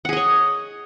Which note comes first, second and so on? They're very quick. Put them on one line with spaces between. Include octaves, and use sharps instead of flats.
F#5 G#4 D#5 C#5